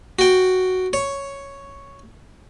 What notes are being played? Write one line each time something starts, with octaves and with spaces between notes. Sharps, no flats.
F#4 G5
C#5